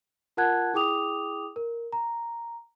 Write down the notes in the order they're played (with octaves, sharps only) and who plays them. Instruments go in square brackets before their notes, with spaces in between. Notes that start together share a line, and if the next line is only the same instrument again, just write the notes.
[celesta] F4 A#4 F#5 A5 F#6 G#6
E4 G#4 G5 D6 D#6 F7
A#4
A#5